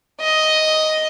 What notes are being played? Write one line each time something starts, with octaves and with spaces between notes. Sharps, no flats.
D#5